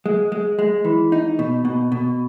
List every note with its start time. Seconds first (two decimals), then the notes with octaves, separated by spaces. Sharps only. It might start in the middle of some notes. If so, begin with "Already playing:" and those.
0.06 G#3
0.32 G#3
0.59 G#3
0.85 E3
1.12 D#4
1.39 B2
1.65 B2
1.92 B2